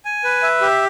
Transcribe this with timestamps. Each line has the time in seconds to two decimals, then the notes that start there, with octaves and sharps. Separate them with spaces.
0.05 G#5
0.24 B4
0.42 E5
0.61 G4